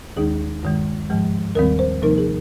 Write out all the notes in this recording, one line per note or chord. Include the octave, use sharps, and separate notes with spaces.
D#2 D#3 G#3 D#4 G#4
G2 D#3 G#3
G#2 F3 G#3
D#2 D#3 G3 C4 A#4
C5
C3 F3 A#3 D#4 A#4
G#4